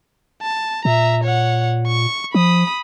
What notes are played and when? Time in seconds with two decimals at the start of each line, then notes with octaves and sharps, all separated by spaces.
0.42 A5
0.85 A#2 E5 A#5
1.24 C#5 F#5
1.88 C#6
2.34 F3 B5 D#6